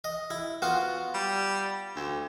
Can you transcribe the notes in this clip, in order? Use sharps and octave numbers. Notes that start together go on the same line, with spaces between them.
D#5
E4
B3 F4 F#4
G3
D2